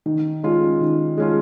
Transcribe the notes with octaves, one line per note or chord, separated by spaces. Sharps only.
D#3
G#3 C#4 F4
D#3
G#3 C#4 F4